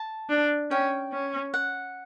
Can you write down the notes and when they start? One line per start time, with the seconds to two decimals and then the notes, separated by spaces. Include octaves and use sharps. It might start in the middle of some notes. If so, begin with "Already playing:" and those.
Already playing: A5
0.29 D4
0.71 C#4 G5
1.12 C#4
1.54 F#5